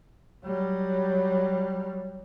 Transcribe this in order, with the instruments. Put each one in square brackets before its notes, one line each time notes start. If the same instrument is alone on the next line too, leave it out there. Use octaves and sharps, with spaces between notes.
[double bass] F#3 G3